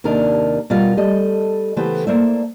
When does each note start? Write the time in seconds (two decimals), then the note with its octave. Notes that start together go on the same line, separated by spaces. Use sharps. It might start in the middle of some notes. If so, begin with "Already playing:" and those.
0.04 D#2 C3 D4 A#4 D#5
0.70 B2 G3 F4 A#4
0.97 G3 A3 D#5
1.76 C#3 E3 A3 B3 G4 C5
2.07 A3 A#3 C5 D5 E5